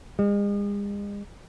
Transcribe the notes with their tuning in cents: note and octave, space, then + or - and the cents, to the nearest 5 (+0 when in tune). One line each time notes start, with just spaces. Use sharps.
G#3 -40